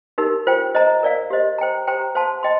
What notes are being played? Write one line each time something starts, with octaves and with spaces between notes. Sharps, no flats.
D#4 G4 A#4
F4 C5 G5
C5 D#5 A#5
A#4 D5 F5
G4 C5 D#5
C5 G5 A#5
G4 C5 G5 A#5
C5 F5 A5 C6
D#5 G5 C6